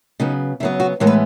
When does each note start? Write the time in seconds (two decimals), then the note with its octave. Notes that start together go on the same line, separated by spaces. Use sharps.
0.20 C#3 F#3 B3 D#4
0.60 C#3 F#3 B3 E4
0.80 F#4
1.00 A2 E3 G#3 B3 A#4
1.07 B4